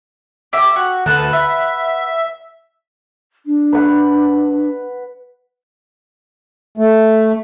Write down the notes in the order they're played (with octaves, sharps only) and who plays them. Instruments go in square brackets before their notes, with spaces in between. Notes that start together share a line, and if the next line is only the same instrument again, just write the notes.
[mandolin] G4 E5
F#4
[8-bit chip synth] D2 A5 [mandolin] B4 F#5
[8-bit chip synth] E5
[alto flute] D4
[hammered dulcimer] B4 F#5
[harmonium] A3